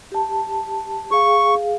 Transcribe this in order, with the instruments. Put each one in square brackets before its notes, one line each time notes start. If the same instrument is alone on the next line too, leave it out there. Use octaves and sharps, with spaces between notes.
[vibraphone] G4 A5
[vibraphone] G#4 F5 [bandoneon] C#6